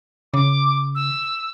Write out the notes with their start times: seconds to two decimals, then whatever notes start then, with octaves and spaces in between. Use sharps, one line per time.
0.34 C#3 D6
0.95 E6